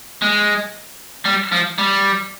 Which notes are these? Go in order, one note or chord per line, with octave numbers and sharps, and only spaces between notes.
G#3
G3
F3
G3